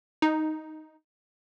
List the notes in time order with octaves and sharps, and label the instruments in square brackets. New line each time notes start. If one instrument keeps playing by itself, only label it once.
[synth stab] D#4